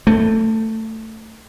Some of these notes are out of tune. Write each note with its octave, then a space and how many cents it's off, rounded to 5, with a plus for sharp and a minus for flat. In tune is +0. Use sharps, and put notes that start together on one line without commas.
A3 +15